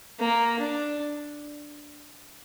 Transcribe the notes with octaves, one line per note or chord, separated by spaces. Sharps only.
A#3
D4